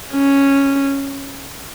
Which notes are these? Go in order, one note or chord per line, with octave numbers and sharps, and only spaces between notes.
C#4